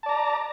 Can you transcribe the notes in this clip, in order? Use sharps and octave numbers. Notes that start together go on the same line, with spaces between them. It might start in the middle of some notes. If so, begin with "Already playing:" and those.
D5 A5 A#5